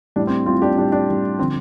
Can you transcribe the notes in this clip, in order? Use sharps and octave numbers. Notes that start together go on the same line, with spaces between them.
A2 G3 D4
C4
A2 G3 C4 F4
D4 G4
A2 G3 D4
D4
A2 G3
D3 F3 C4